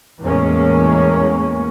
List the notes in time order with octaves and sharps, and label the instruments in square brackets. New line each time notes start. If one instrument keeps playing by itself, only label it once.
[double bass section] E2 A2 G#3 A#3 C#4